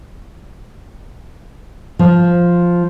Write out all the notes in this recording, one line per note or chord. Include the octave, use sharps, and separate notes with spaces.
F3